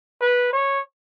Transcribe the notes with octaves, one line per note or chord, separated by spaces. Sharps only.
B4
C#5